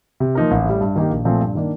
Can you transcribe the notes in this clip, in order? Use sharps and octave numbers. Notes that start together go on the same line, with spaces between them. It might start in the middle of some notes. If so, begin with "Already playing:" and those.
C3
F3 A#3 D#4 A#4
A1
A2 G3
G2
D#3 A#3 D#4 G4
A#1
A#2 F3 A3 C4
G2
D#3 A#3 D4